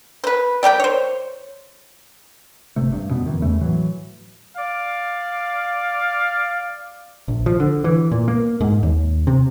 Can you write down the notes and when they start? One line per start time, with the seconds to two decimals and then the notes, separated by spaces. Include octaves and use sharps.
0.24 B4 C5
0.63 G3 G4 A4 G5
0.80 C5 C#5
2.76 G1 C3 A3
2.92 G2
3.10 F#2 B2 B3
3.24 F#2 D#3 E3
3.40 E2 C#3 A3
3.61 A2 E3 F#3
4.57 D5 F5
7.28 A#1
7.46 F3
7.60 D3
7.84 E3
8.12 A#2
8.28 A#3
8.61 G#2
8.83 D#2
9.27 C3